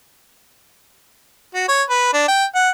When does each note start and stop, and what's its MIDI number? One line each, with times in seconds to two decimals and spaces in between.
1.54 1.65 66
1.68 1.83 73
1.89 2.11 71
2.13 2.24 62
2.28 2.45 79
2.55 2.70 78